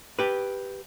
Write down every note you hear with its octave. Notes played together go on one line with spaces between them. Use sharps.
G4 B4